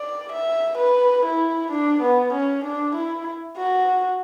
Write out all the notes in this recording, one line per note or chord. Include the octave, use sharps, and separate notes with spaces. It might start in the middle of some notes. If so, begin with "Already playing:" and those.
Already playing: D5
E5
B4
E4
D4
B3
C#4
D4
E4
F#4